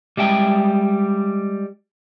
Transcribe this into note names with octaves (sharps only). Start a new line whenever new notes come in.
G3 G#3 E5 G5